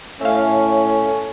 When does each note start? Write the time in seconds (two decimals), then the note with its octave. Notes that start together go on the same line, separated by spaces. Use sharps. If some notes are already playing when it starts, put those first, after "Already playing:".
0.21 A2 C#4 A4 E5 F5